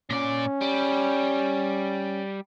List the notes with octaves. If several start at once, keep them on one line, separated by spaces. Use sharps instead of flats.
A#2 C#4 D5
G3